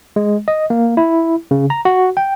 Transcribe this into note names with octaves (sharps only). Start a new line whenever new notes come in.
G#3
D#5
A#3
E4
C#3
A#5
F#4
G5